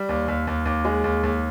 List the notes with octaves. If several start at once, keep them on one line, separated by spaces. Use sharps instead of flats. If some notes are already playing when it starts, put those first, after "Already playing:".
Already playing: G3
D#2
D#2
D#2
D#2
G#3
D#2
D#2